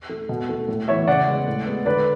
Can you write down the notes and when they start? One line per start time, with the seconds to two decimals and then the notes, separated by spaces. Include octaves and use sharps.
0.09 A3
0.29 B2
0.49 A3
0.68 A2
0.88 E3 B3 C#5 E5
1.07 C#3 D5 F#5
1.27 G#3 B3
1.47 A2
1.66 G#3 B3
1.85 D3 B4 D5